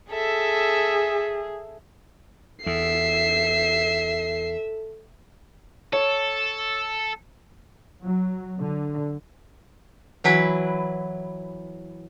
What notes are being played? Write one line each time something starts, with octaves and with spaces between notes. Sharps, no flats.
G#4 A4 E5
E2 A4 E5 C7
A4 C#5
F#3
D3
E3 F#3 E4 B4